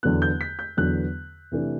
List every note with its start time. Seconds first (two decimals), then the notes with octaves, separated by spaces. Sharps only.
0.03 E2 D3 F#3 B3 F#6
0.22 G6
0.41 B6
0.59 G6
0.77 E2 D3 F#3 B3 F#6
1.52 C3 E3 A3 D4